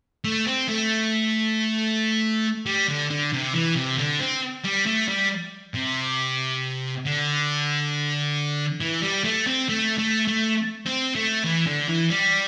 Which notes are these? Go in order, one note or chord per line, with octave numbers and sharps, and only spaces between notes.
A3
C4
A3
G3
D3
D3
C3
E3
C3
D3
C4
G3
A3
G3
C3
D3
E3
G3
A3
C4
A3
A3
A3
C4
A3
E3
D3
E3
G3